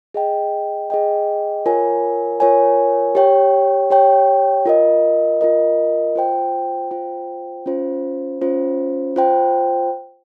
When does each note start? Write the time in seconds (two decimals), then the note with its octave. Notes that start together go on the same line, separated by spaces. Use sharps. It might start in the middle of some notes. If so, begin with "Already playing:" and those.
0.14 G#4 D#5 G5
0.90 G#4 D#5 G5
1.66 F4 A#4 C#5 G#5
2.40 F4 A#4 C#5 G#5
3.15 G4 C#5 G5
3.90 G4 C#5 G5
4.66 F4 A#4 D#5
5.41 F4 A#4 D#5
6.16 F4 C5 G5
6.91 F4 C5 G5
7.66 C#4 F4 C5
8.41 C#4 F4 C5
9.16 F4 C5 G5